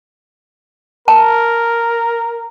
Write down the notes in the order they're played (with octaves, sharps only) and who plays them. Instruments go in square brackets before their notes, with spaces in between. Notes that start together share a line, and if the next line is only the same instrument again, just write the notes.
[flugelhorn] A#4 [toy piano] A5